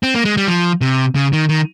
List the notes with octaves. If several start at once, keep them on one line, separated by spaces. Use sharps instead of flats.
C4
A#3
G#3
G3
F3
C3
C#3
D#3
D#3